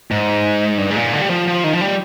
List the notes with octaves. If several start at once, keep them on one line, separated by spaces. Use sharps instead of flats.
G#2
G2
G#2
A#2
D3
G3
F3
F3
D#3
F3
G3